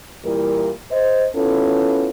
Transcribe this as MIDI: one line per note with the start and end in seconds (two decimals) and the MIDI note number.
0.25 0.72 46
0.25 0.72 52
0.25 0.72 55
0.25 0.72 58
0.25 0.72 64
0.25 0.72 70
0.92 1.26 72
0.92 1.26 75
1.35 2.09 59
1.35 2.09 61
1.35 2.09 64
1.35 2.09 65
1.35 2.09 69